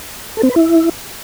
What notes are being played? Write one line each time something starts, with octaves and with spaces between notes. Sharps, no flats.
A4
C4
B4
E4